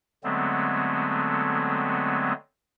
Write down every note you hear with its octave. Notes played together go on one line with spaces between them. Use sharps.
D3 F#3 G#3 A3 B3 C4